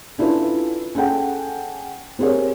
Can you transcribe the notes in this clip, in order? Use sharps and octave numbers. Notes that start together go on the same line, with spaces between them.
C#4 D4 E4 F4 A4 B4
C#4 G#4 A4 F#5 G5
C4 G4 G#4 A#4 C#5